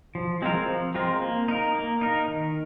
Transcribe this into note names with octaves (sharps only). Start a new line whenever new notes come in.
F3
G#3 C4 F4 A#4
F3
G#3 C4 F4 A#4
A#3
D#4 A#4
A#3
D#4 A#4
D#3